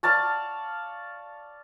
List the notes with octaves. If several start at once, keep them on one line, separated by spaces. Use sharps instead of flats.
D5 F5 A5 C#6